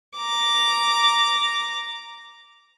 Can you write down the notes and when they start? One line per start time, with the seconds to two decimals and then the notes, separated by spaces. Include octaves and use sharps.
0.18 A#5 D6